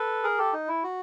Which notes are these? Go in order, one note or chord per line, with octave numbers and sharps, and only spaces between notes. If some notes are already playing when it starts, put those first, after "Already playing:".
Already playing: A4 B4
G#4 A#4
G4 A4
D#4
E4
F#4